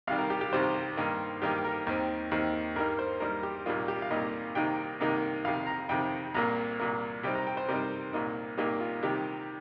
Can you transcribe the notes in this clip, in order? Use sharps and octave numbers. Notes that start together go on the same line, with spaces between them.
C2 C3 D#3 G3 F5
A#4
G4
G4
C2 C3 D#3 G3 C5
G2 D#3 A#3 D#4
G2 D#3 A#3 D#4 G4
A#4
D#2 D#3 C4
D#2 D#3 C4
G2 G3 A#3 D#4 A#4
C5
G2 G3 A#3 D#4 A#4
G4
C2 A#2 G3 A#3 D#4 F4
G4
F5
C2 A#2 G3 A#3 D#4 D#5
C2 C3 D#3 A#3 D#4 G5
C2 C3 D#3 A#3 D#4
F2 C3 D#3 F5
A#5
F2 C3 D#3 G5
C2 A#2 A#3 A#5
C2 A#2 A#3
C3 G3 C4 D#4 G5
A#5
G5
C5
C3 G3 C4 D#4 A#4
C2 A#2 A#3 D#4
C2 A#2 A#3 D#4 G4
F4
C3 D#3 G3 G4